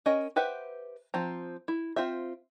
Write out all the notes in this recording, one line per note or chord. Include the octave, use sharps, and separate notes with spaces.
C#4 A#4 D#5
G4 B4 C5 E5 F#5
F3 C4 A#5
E4
C4 F4 C5 E5